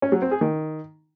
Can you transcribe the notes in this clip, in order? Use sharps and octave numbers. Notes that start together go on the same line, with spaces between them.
C#4
F#3
C4
G#4
D#3